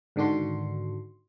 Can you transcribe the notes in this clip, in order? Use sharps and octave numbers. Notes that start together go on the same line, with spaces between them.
G#2 D3 D#3 D4 F#4 C6